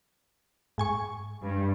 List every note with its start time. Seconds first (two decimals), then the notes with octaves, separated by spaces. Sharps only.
0.78 G#2 G#5 C#6
1.42 G2